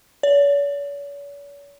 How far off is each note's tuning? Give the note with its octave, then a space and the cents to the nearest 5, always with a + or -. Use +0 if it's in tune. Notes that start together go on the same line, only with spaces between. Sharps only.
C#5 +45